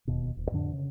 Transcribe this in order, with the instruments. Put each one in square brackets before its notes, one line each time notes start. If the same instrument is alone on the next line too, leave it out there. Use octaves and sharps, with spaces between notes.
[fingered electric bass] E1 D#2 B2
D#1
F2 A2 D3 D4
C#3